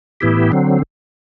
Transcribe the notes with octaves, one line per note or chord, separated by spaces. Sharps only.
A2 E3 B3 E4 G4
D3 F#3 C4